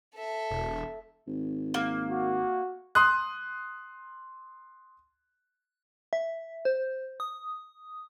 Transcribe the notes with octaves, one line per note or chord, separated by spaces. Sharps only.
A4 E5
E1
G#1
A#3
F#4
C6 D#6 F#6
E5
C5
D#6